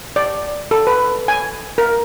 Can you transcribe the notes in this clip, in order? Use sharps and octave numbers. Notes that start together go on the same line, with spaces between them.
D5
A4
B4
G#5
A#4